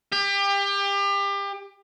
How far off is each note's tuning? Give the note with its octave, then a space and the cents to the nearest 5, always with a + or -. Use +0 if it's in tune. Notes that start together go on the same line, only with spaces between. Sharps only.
G4 +30